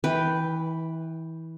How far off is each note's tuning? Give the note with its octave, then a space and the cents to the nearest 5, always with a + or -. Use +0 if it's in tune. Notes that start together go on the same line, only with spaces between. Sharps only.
E3 -25 B4 +0 G5 +0